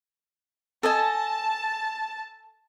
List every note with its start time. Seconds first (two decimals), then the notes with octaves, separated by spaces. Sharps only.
0.83 A4 D#5 G#5 A5